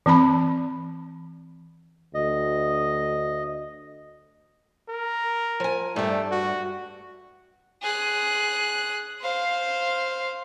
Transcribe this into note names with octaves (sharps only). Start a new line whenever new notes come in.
E3 C4 A5 B5
D2 D#5
A#4
F3 G#5
G2 G3 A3
F#4
G#4 F#6
C5 F5